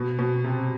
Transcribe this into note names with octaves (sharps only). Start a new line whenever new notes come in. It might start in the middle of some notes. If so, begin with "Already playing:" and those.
Already playing: B2
B2
C3